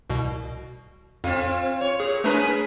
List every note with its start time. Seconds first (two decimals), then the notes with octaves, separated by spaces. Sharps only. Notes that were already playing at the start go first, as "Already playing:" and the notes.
0.10 C2 B2
1.24 F2 C4 F4
1.81 C#5
2.00 A#2 G#4
2.24 A3 D4 G#4 A#4 B4